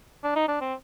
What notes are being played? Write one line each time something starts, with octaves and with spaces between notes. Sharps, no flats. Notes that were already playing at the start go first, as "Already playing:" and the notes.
D4
D#4
D4
C4